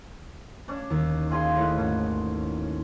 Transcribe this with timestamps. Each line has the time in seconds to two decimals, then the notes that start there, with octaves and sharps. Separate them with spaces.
0.68 C#4 D4
0.90 D#2
1.30 F4 G#4 C6
1.56 A2 D#4 B4
1.78 G#1 C#4